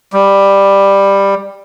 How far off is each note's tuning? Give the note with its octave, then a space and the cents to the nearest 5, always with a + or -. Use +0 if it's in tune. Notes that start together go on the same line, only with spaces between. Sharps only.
G3 +10